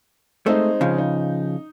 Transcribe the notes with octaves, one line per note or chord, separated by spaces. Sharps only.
G#3 A3 C4 D#4
C#3 F3
D#4